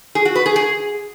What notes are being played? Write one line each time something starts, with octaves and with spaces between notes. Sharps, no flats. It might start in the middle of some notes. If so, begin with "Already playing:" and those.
G#4
F#4
B4
G#4
G#4